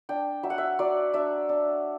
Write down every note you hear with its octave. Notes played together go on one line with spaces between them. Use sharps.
D4 G5
F#3 E5
F#5
E5
F#3 D5
D4 E5
D4